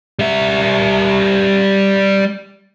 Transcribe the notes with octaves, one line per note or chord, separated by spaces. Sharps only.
G3 E5